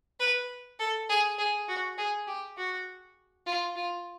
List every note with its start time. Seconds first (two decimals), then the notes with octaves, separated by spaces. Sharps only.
0.20 B4
0.79 A4
1.09 G#4
1.38 G#4
1.68 F#4
1.98 G#4
2.27 G4
2.57 F#4
3.46 F4
3.76 F4